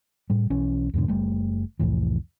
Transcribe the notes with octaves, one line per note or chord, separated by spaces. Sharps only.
A2 G3
B1 E3 C#4
E2 G#2 B2 D3
F#1 G3 A3
C2 F2 A2 E3